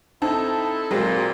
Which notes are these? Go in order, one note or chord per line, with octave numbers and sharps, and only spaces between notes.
C4 D#4 E4 A4 A5
A#2 F#3 G#3 C4